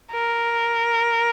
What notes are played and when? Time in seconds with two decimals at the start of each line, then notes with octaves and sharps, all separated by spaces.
0.12 A#4